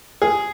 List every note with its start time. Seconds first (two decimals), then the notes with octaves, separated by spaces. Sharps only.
0.22 G#4